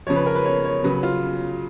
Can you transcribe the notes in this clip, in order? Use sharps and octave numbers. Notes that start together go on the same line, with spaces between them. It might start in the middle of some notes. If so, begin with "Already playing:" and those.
C#3 F3 C#5
B4
A#4
B4
C#5
C#5
C#3 F#3 B4
F4